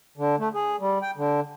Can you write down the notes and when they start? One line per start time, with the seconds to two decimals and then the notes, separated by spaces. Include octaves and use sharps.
0.17 D3
0.39 A3
0.54 G#4
0.80 G3
1.02 G5
1.17 D3